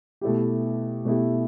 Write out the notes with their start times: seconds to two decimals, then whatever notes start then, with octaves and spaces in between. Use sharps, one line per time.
0.21 B2 A3 E4 G4
1.05 B2 A3 E4 G4